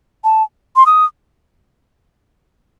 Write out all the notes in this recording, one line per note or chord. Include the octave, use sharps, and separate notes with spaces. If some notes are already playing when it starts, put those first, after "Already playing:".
A5
C6
D#6